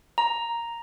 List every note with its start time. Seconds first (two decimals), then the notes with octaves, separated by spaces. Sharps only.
0.18 A#5